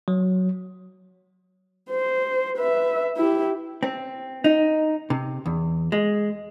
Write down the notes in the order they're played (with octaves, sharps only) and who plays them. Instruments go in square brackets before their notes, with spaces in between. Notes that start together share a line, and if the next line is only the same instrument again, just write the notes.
[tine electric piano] F#3
[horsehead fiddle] C5
B4 E5
E4 G4
[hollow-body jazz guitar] C4
D#4
C3
E2
G#3